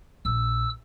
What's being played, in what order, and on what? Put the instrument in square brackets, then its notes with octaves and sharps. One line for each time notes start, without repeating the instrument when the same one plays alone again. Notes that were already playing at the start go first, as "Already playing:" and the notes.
[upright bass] A#1 F3 [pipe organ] E6